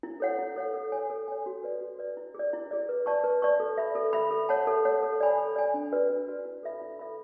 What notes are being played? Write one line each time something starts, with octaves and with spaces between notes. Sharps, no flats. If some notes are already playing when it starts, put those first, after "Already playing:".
E4
A4 C#5 F#5
E4
A4 C#5 F#5
A4
C#5 G#5
A4
C#5 G#5
F#4
B4 D5
F#4
B4 D5
E4
G#4 D5
E4
G#4 D5
B4
D5 A5 C#6
B4
D5 A5 C#6
A4
E5 B5
A4
E5 B5
A4
C#5 F#5 A5
A4
C#5 F#5 A5
A4
D5 G#5 B5
A4
D5 G#5 B5
D4
F#4 B4 D5
D4
F#4 B4 D5
E4
A4 E5 B5
E4
A4 E5 B5